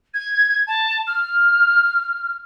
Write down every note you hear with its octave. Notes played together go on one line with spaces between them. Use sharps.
G#6
A5
F6